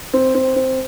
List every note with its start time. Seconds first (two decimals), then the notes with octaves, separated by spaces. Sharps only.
0.13 C4
0.35 C4
0.56 C4